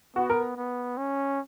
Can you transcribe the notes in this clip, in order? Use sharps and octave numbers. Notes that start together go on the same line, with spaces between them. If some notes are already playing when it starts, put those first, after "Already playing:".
B3 F#4
A#4
B3
C#4